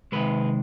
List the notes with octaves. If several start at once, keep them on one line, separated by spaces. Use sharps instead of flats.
C3 D#3 G#3 B4